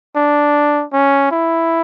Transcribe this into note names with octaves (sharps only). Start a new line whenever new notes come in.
D4
C#4
E4